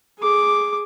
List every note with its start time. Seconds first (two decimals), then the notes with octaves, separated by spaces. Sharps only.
0.19 G#4 D6